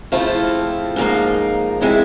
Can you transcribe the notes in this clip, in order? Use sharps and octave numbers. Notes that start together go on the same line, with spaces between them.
C#3 F3 A3 C4 E4 F4 F5
G#2 F3 A#3 D#4
E3 G#3 C4 E4 E5